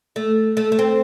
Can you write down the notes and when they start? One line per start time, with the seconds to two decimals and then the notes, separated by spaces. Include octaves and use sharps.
0.16 A3
0.57 A3
0.72 A3
0.79 C4